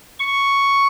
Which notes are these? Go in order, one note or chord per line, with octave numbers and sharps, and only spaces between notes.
C#6